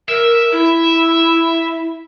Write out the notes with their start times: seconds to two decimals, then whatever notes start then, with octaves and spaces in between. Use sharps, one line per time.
0.09 A#4 E5
0.52 E4